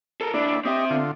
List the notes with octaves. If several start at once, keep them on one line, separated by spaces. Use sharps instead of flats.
A4 A#4
D#2 D4 E4 D5
C4 G4 D#5 E5
D3 F4